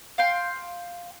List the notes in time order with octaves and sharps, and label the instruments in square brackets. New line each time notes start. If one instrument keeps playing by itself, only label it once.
[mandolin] F5 G5 C6